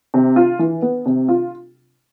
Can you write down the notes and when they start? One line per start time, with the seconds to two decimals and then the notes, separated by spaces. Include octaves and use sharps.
0.14 C3
0.36 F4
0.59 E3
0.82 B3
1.06 C3
1.28 F4